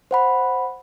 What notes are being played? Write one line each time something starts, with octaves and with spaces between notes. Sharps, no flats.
C5 F#5 B5